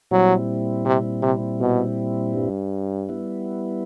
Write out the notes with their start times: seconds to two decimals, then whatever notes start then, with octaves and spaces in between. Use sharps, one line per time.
0.11 A#2 F#3 G3 C4 E4
0.85 C3
1.22 C3
1.60 B2
2.34 G2
3.09 G3 B3 E4